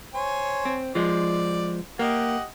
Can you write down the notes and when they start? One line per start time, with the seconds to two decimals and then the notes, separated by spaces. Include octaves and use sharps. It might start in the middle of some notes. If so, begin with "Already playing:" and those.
0.14 C5 C#5 G#5
0.65 C4
0.95 F3 G#3 D5
1.99 A#3 G4 D#5 F#5